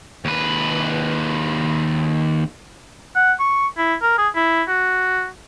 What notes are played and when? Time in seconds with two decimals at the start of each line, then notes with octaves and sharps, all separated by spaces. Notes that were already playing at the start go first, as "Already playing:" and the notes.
0.25 D#2 B4
3.15 F#5
3.40 C#6
3.77 E4
4.02 A#4
4.18 G#4
4.35 E4
4.68 F#4